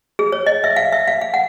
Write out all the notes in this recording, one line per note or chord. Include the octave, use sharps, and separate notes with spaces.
G#4
C#5
D#5
E5
F5
E5
F5
F5
F#5